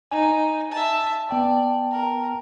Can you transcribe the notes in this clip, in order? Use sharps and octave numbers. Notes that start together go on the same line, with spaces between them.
D#4 G#5
E5 A5
B3 D5 G5 A5
A#4